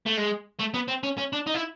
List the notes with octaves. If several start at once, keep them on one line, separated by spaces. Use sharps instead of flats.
A3
G#3
A3
B3
C4
C#4
C#4
D4
D#4
E4